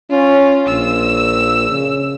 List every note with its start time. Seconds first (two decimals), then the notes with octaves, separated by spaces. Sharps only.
0.11 C#4 F4
0.67 A#1 E6
1.70 C#3